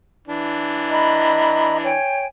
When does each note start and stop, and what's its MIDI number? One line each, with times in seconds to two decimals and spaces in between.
0.28 1.94 52
0.28 1.94 62
0.90 1.76 75
0.90 1.76 82
0.90 1.76 83
1.83 2.26 73
1.83 2.26 79
1.83 2.26 80